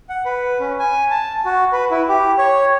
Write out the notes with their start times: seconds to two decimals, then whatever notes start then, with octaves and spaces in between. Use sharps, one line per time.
0.09 F#5
0.25 B4
0.60 C#4
0.79 G#5
1.10 A5
1.45 F#4
1.72 B4
1.91 E4
2.09 G4
2.38 C#5